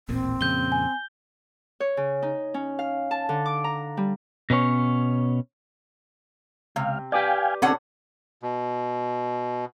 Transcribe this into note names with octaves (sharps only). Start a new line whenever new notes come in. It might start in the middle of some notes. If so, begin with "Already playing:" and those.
D#1 A1 A#2 C4
F2 A#2 C#3 G6 G7
G#5
C#5
C#3
D#4
C#4
F5
A5
D3
D6
A#5
G3
B2 B3 C#4 C#5
C#2 C3 F5
G4 B4 D5 F5 G5 G#5
D3 C4 C#4 A4 F#5
B2